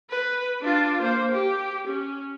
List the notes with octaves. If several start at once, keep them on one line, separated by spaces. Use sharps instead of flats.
B4
D4 F4
A#3 C5
G4
C#4